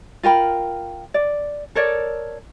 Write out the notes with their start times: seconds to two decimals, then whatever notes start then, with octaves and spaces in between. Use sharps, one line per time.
0.23 F4 A#4 G5 B5
1.14 D5
1.75 A4 A#4 C#5 D5